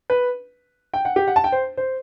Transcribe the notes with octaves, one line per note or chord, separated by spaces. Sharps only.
B4
G5
F#5
G4
F#5
A5
G5
C5
C5